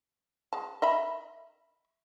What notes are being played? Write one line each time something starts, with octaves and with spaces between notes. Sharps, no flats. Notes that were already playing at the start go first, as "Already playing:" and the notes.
G#3 A5
D#5 E5 B5